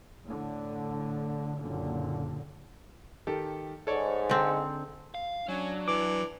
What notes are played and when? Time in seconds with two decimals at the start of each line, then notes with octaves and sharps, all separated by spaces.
0.24 A2 D3
1.58 F#1 A#2 D3
3.27 D#3 G4 A4
3.87 G#2 A4 C#5 D5
4.29 D3 C4
5.14 F5
5.48 F#3 C#4 D4
5.88 E3 D6